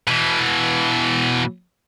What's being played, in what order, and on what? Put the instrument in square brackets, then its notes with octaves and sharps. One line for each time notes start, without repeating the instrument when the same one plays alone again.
[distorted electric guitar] B2 E3